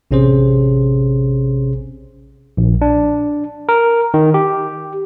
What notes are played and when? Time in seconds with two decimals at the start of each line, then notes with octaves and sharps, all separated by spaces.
0.11 A1 C3 C#4 G#4 C5
2.57 A#1
2.81 D4
3.69 A#4
4.14 D#3
4.34 G4